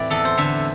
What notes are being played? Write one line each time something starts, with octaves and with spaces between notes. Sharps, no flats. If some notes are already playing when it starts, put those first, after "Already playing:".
Already playing: A2 E3 C4 E4 D5
E2 A4
C5
D3 E5